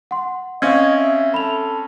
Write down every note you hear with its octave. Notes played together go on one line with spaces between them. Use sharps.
F#5 C6
C4 C#4 D#5 F5 G#6
E5
A4 B5 F7